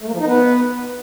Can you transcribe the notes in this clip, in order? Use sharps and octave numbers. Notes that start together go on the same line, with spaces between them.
A3
A#3
F3
D#4
B3